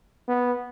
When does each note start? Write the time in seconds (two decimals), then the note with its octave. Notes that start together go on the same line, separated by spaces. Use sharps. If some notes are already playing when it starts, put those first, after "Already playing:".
0.28 B3